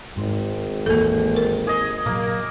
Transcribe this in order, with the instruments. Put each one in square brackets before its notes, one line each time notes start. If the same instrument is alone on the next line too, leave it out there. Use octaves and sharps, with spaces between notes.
[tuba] G#1 [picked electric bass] G#2 G#3
[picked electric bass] A1 E2 [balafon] A#3 A4
[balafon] A#4
[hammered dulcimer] G#4 D#5
[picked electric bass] A#2 F#3 [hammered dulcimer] A#3